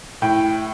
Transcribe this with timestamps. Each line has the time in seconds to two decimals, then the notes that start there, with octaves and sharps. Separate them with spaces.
0.22 A2 G5